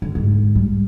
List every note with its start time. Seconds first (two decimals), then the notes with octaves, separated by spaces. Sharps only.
0.02 D3
0.15 G#2
0.56 G3